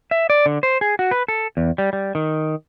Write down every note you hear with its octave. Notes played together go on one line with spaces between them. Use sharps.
E5
D5
D3
C5
G#4
F#4
B4
A4
E2
G3
G3
D#3